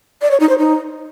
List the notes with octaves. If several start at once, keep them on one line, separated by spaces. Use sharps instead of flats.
D5
C#5
D#4
C5
D#4